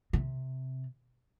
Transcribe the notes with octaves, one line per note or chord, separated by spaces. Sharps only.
C3